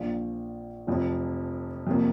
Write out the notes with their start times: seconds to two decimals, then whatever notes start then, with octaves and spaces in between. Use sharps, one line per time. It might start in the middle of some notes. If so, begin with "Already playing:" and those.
Already playing: A#1 A#2 F3
0.87 F1 F2 F3
1.87 F2 C3 A#3